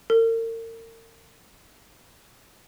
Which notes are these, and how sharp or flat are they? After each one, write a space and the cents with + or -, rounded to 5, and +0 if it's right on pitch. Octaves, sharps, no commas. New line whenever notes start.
A#4 -40